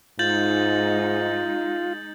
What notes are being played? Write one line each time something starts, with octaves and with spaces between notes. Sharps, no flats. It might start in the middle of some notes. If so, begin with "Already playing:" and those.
G#2 G#3 D#4 F4 G6 A6 F#7